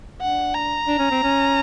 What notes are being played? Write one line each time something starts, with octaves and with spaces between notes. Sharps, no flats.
D4 F#5
A#5
D4
C#4
C4
C#4